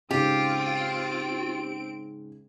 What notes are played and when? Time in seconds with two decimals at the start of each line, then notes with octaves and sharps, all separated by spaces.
0.11 G#2 C#3 C4 F4 G4 D7